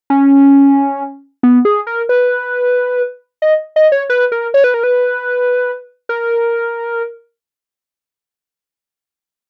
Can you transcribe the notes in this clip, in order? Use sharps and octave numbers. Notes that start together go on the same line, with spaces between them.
C#4
B3
G#4
A#4
B4
D#5
D#5
C#5
B4
A#4
C#5
B4
A#4
B4
A#4